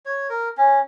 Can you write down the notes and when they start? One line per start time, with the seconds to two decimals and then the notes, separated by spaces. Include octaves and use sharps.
0.05 C#5
0.29 A#4
0.58 C#4